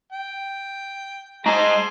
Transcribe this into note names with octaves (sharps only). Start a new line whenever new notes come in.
G5
G#3 G#4 C5 A5 A#5